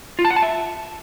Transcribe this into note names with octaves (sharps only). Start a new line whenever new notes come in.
F4
A5
F#5
A5
E5